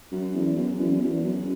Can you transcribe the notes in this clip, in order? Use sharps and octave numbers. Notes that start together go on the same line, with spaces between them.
F#2
E2
F#2
E2
F#2
E2
F#2